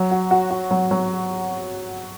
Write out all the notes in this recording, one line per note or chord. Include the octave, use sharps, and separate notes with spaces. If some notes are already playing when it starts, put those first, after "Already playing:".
Already playing: F#3
F#4
F#4
F#4
F#3
F#3